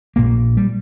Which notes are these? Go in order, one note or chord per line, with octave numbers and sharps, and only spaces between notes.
A#1 A#2 A#3
G3